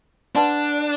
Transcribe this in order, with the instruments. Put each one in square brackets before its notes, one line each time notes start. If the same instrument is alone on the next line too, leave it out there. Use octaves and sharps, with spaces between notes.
[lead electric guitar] D4 [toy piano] B4 D5 F#5 A5 C6